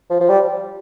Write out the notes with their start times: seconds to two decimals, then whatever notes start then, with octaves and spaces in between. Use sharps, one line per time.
0.10 F3
0.20 F3
0.29 G3